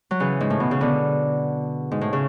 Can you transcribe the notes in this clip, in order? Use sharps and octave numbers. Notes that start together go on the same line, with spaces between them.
F#3
C#3 E3
G#2
A2
B2
C#3
B2 D3
G#2
A2
C#3